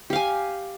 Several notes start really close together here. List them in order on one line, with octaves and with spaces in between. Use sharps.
G4 F5 G#5